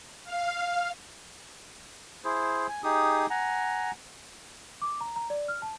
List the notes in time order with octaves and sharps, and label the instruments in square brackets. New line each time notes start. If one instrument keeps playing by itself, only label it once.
[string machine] F5
[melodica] E4 G#4 C5
G#5
D#4 G4 G#4 D#6
F#5 G#5 A#5
[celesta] D6
A#5
A#5
D5
F6
A5